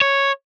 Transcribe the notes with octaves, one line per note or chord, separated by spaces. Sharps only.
C#5